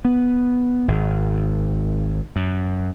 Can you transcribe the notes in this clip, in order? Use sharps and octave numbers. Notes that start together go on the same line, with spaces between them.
B3
G#1
F#2